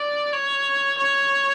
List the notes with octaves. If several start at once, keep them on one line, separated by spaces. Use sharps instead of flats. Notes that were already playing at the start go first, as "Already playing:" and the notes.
Already playing: D5
C#5
C#5